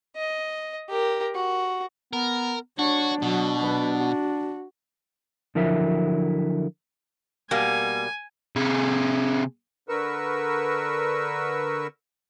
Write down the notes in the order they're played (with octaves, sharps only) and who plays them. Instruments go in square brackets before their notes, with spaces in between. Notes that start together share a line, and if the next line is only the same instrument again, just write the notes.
[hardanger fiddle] D#5
G4 A#4
F#4
[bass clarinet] B3 [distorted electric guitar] A#4
[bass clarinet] D4 [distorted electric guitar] F#4 [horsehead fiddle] C#5
[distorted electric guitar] B2 [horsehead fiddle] F#3
[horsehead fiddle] F#3 B4
F#4
[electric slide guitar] D3 F3 F#3 E4 A#4 E5
[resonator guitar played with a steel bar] B2 G3 A#3 [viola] G#5
[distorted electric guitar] C3 G#4
[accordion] D3 A#4 B4 C#6 E6